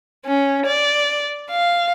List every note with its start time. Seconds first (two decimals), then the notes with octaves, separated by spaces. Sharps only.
0.26 C#4
0.66 D5
1.50 F5